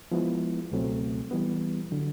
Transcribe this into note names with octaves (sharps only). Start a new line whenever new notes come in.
F3 G#3 B3 E4
C#2 B2 F#3 A3 C4
E3 G3 B3
D3 F#3